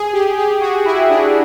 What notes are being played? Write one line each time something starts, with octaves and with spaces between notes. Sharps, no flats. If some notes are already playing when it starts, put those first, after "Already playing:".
Already playing: G#4
G4
G4
F#4
E4
D4